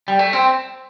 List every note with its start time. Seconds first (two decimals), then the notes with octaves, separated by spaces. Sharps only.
0.08 G3
0.19 A3
0.33 C4